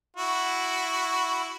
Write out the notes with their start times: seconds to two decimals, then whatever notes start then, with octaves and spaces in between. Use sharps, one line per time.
0.16 E4 F#4